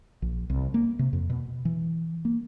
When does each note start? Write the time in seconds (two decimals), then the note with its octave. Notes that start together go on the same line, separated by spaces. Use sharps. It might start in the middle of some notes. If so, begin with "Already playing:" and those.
0.22 A#1
0.50 C2
0.74 A#3
0.99 C3
1.13 F2
1.30 B2
1.65 E3
2.25 A#3